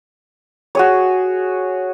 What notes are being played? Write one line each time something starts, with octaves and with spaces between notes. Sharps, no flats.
F#4 G#4 C#5